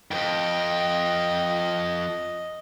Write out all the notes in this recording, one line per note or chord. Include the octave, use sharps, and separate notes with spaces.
F2 G#2 D#5 G5